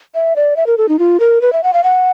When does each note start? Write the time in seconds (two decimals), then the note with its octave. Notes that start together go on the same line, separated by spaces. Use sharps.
0.15 E5
0.36 D5
0.57 E5
0.67 A#4
0.78 A4
0.89 D#4
0.99 F4
1.20 A#4
1.42 B4
1.53 E5
1.63 F#5
1.74 F5
1.84 F#5